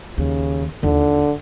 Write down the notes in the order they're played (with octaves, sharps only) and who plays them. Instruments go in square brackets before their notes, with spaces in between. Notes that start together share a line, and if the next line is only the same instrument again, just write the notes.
[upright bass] D#2 [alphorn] C#3
[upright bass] D#2 F4 [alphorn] D3